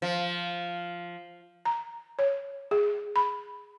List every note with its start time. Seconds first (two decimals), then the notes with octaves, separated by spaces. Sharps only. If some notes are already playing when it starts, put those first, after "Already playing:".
0.02 F3
1.65 A#5
2.19 C#5
2.71 G#4
3.16 B5